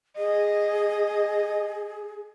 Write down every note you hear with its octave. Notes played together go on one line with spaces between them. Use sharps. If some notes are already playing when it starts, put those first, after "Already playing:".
G#4 D#5